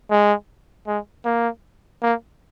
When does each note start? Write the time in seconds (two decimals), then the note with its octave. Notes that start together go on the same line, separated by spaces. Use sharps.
0.11 G#3
0.87 G#3
1.25 A#3
2.02 A#3